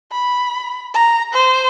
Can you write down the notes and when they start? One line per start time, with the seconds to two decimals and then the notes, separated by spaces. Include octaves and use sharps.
0.12 B5
0.94 A#5
1.33 C5